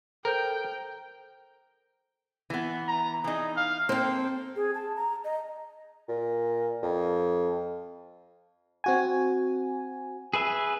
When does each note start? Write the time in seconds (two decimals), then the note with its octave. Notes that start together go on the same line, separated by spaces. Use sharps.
0.25 A4 A#4 C5 G5 G6
2.50 E3 B3
2.88 A#5
3.24 E3 D#4 G#4
3.57 F5
3.89 A#3 C4 A4 C5 G5
4.56 G#4
4.74 A5
4.96 A#5
5.24 D#5
6.09 A#2
6.83 F2
8.84 C4 F#4 G#5
10.33 G#4 B4 E5